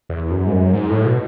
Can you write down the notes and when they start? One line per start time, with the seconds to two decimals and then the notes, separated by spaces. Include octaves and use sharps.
0.09 E2
0.31 F#2
0.47 G#2
0.53 F#2
0.73 G#2
0.90 A2
1.05 B2